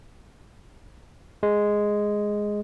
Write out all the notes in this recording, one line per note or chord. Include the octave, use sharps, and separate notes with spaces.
G#3